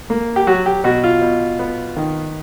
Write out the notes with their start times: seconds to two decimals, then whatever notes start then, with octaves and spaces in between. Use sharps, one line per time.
0.10 A#3
0.36 G4
0.47 F#3 F#4
0.66 G4
0.84 B2 F#4
1.04 F4
1.22 B2
1.59 B3
1.96 D#3